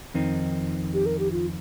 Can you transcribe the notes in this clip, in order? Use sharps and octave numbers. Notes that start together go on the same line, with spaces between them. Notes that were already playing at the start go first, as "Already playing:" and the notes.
F2 D#3 C4 D#4
G4
A#4
G4
F4